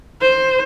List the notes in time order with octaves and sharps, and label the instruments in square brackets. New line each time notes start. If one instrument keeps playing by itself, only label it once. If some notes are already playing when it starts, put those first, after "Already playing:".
[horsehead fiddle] C5